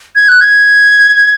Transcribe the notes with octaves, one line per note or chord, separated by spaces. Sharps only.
G#6
F#6
G#6